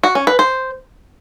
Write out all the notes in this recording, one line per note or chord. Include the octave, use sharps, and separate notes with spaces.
F#4
C#4
B4
C5